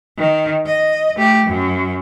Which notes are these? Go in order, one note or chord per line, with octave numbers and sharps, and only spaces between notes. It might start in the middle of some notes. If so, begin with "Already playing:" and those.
D#3
D#5
A3 G4
F#2